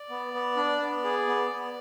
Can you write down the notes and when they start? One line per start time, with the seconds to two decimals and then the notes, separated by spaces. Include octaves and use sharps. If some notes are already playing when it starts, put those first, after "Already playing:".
Already playing: D5
0.10 B3
0.33 B3
0.57 D4
0.80 B3
1.04 G#4
1.27 B3
1.51 B3